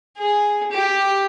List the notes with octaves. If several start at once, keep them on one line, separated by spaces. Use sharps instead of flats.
G#4
G4